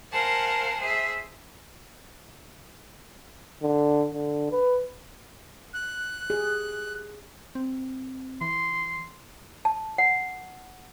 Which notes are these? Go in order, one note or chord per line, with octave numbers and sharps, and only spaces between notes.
A#4 C5 F5 F#5 G#5 A5
G#4 C5 E5
D3
D3
B4
F#6
G4 G#4
C4
E3 C6
A5
F#5